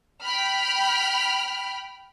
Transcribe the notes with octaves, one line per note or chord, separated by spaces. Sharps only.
G5 B5 F6